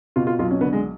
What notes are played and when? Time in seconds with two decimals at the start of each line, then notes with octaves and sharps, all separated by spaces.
0.16 B2 F4
0.27 F4
0.39 B1 F4
0.51 C#4
0.61 D3 B3
0.73 G#3